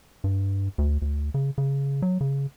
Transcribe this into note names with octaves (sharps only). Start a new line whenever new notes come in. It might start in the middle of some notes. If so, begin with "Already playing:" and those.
G2
D2
D2
C#3
C#3
F#3
C#3